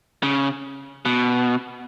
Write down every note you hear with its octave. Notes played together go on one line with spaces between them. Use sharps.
C#3
B2